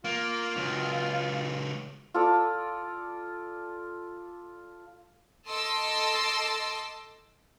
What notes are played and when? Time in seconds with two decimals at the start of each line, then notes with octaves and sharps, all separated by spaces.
0.05 A#3 F4
0.56 C#2 F#3
2.14 F4 A4 D5
5.48 A4 D#5 A5 C6 D6 E6